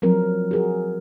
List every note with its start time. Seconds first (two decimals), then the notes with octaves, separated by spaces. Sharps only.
0.02 F3 F#3 C4 A#4
0.51 F#4 G#4 A#4